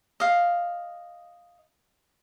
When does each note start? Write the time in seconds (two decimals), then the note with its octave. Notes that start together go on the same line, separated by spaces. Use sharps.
0.20 D#5 F5